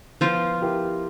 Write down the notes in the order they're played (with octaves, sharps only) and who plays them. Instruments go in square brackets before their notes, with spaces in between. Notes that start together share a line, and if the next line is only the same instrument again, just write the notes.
[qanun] F3 F4 [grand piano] B3
[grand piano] E4 G4 A#4